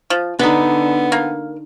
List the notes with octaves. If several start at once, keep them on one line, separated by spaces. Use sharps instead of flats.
F3
D3 B3 D4 D#4 B4
A#3